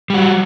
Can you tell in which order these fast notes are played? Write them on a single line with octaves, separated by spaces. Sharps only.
G3 F#4 F#3